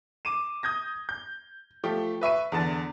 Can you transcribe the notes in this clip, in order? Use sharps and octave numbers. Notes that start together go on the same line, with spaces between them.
D6 D#7 E7
D#6 G6 G#6 A#6
G6
F3 A3 G4
B4 E5 C#6 D#7
E2 D3 A5 A6